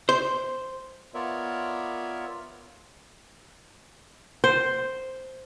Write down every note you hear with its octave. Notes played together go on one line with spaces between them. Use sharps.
C5
B3 F4 A#4 C#5 D5 E5
C5